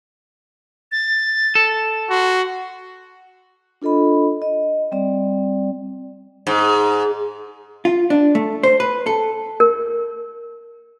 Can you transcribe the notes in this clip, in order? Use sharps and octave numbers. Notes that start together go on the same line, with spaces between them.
A6
A4
F#4 C6
D4 F4 A4 D#5 B5
D#5
G3 C4 D5
G#2
F4
D4
A3
C5
B4
A4
A#4